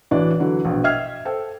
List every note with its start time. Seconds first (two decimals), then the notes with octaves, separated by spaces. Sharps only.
0.11 A1 E3 D4 F#4 D5
0.40 D3 E3 F#3
0.65 A#1 B2
0.84 D#5 E5 G5 F6 G#6 C7
1.25 A4 C5 G5